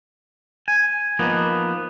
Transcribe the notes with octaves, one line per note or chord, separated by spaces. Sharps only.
G#5
F3 A#3 B3 D#4